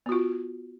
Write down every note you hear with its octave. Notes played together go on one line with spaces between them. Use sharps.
B3 F4 F#4